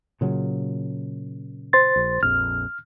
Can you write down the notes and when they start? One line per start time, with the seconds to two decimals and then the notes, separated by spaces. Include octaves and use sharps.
0.21 A#2 C#3 F#3
1.73 C5 C6 A6
1.96 A#1
2.23 A#1 F2 F6